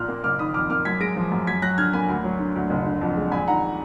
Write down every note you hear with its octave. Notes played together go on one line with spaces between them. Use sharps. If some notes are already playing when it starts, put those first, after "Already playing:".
Already playing: A#1 A#2 F6 F#6
A#3
F#1 D6 F6
D#3 B5 D#6
F2 D6 F6
A#3 D6 F6
F#2 G#6 B6
G#3 A#6 D7
F3
F#2
F#2 G#6 B6
F#3 F#6 A#6
D3 F6 G#6
A#3 G#5 B5
D2
F#3
D3
D2
F#1
D3
F2
G#3
A#1 G#5 B5
D#3 F#5 A#5